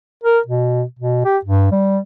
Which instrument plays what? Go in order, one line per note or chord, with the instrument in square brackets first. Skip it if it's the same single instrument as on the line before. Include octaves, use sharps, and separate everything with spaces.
[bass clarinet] A#4
B2
B2
G4
G2
G3